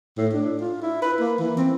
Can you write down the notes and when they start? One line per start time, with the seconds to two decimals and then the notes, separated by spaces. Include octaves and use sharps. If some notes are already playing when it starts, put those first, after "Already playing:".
0.17 A2
0.33 D4
0.59 F4
0.82 E4
1.02 B4
1.20 A#3
1.39 E3
1.57 C4